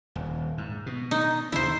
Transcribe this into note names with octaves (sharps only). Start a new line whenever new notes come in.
D#1
G#2
B2
D#4
D#2 C#3 E3 E4 C5